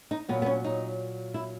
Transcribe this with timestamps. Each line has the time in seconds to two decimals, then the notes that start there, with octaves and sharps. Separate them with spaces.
0.11 D#4
0.29 A#2 F#3 B3
0.42 B3
0.46 C#4
0.64 D#4
1.34 E4